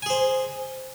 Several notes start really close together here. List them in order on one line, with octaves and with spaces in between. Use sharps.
G#5 G#4 C5